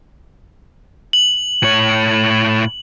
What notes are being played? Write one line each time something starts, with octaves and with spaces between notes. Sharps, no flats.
F#7
A2 C#5